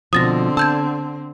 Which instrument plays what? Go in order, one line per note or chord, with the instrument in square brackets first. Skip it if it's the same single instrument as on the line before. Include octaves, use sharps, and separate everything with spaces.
[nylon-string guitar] B2 F3 [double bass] D3 C4 [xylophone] D#6 A6 A#6
[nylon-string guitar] A5 [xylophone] E6 G6 G#6